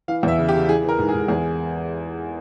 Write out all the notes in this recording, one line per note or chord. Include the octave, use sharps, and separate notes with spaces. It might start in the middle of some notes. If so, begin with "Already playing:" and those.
E3 F5
E2 E5
C#3
G4
C#3
E3 G#4
E3 A#4
G#2
G#4
G#2
E2 G#4